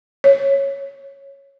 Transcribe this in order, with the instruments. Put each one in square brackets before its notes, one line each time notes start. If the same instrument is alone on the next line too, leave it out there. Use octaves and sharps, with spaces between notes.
[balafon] C#5